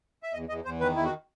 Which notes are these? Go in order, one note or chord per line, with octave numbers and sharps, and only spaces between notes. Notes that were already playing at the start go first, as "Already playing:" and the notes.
E5
E2 D#5
E2 D#5
E2 C5
D#3 B4
E2 E4
F#4